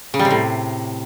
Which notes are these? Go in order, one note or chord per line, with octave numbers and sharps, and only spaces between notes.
C#3
G3
C3
A2